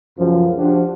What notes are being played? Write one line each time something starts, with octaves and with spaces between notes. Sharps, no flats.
C#2 F#2 F3
F3 D4 F#4 G4